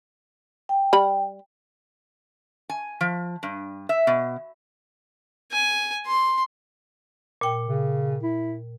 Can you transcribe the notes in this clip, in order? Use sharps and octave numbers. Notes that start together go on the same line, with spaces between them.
G5
G3 B5
G#5
F3
G2
E5
B2
G#5
C6
A#2 G5
C#3
E4